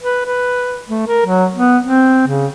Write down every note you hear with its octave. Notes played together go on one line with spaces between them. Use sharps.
B4
B4
A3
A#4
F#3
B3
C4
C#3